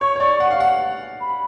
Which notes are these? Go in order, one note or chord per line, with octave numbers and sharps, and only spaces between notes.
C#5 C#6
C#5
D5
F#5
F5
F#5
B5